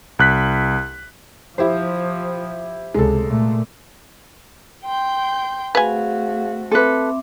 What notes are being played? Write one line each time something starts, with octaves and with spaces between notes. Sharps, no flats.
C2 F#6 B6
F3 E4 G4 C5
C#2 C3 G#3 A4
A#2 A3
G5 C6 G6
A3 C4 F#4 G#4 B4 F5 G#5
C4 A4 B4 E5 D6